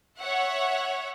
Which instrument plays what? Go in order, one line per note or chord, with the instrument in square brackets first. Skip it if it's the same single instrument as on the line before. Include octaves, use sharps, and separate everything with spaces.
[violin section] C#5 E5 F#5